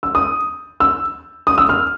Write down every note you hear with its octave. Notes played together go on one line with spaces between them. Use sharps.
E6
D#6
E6
D#6
E6
F6